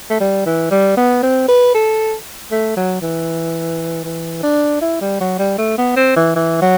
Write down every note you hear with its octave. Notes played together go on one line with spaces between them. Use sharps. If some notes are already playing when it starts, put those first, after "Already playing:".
A3
G3
E3
G3
B3
C4
B4
A4
A3
F#3
E3
E3
D4
E4
G3
F#3
G3
A3
B3
C4
E3
E3
F#3